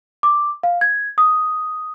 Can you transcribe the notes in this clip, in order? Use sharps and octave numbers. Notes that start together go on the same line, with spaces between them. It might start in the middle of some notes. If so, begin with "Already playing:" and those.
D6
F5
G#6
D#6